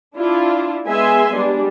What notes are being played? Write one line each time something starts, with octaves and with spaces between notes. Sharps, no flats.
D4 E4 F4
G#3 B3 G#4 E5 G#5 C6
G3 G#3 B3 D4